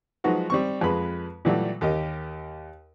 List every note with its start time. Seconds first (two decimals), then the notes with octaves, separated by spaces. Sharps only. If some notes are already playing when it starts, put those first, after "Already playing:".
0.24 F3 F#3 G#3 D#4 F#4 B4
0.50 G3 C4 C#6
0.81 F2 G#3 B4 B5
1.45 A#2 E3 F#3 G3 A3
1.81 D#2 G4 A#4 D#5